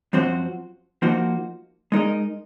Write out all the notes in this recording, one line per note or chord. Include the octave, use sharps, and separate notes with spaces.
F#2 F3 C4 F#4 C5
F3 A#3 D#4 F#4 C5
G#3 D#4 A#4 D#5